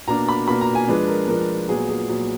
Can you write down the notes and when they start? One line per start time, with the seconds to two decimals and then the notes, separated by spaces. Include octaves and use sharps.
0.08 B2 A#3 D4 A#5
0.29 B5
0.47 B2 A#3 D4 B5
0.61 A#5
0.75 G#5
0.88 F3 G#3 D4 B4
1.08 A#4
1.28 F3 G#3 D4 A#4
1.69 A#2 F#3 B3 G#4
1.89 G#4
2.09 A#2 F#3 B3